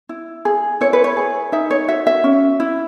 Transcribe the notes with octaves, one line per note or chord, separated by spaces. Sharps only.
E4
G#4
E4 C#5
B4
C#5
G#4
D#4 E5
C#5
F#4 E5
E5
C#4
E4